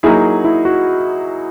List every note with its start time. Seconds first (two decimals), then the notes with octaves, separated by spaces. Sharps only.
0.03 F#3 A#3 D#4 E4 G#4
0.45 E4
0.65 F#4